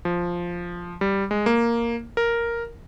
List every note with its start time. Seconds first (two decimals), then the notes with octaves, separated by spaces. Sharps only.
0.05 F3
1.01 G3
1.31 G#3
1.46 A#3
2.17 A#4